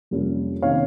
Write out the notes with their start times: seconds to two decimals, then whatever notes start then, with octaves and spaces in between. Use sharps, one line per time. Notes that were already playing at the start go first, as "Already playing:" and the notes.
0.11 F2 C3 G3 A#3 C#4
0.62 C3 D#3 A#3 C#4 C#5 F5